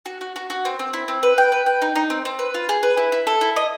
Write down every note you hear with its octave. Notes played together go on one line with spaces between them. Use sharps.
F#4
F#4
F#4
F#4
C4
C4
E4
C4
B4
G5
B4
G5
D#4
D#4
C4
C4
B4
F4
G#4
B4
E4
E4
A4
E4
D#5